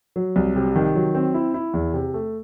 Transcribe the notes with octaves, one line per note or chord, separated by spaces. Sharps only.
F#3
C2
C3
D#3
F#3
C4
E4
E4
E2
C3
A3